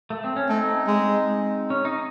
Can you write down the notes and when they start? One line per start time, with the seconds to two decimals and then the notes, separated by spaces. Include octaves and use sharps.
0.10 A3
0.24 C4
0.36 C#4
0.49 A3 C4 D#4
0.87 G#3
1.70 C#4
1.85 D#4